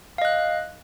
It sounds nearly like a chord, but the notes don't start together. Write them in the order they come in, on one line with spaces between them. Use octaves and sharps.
F5 D#5 F#6